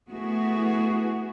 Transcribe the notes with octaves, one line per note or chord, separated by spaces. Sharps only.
A3 B3 E4 F#4 G#4